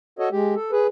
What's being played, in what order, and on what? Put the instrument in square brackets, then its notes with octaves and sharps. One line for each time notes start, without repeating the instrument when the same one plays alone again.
[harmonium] F#4 A4 C#5 D#5
G#3 G4
A4
G#4 B4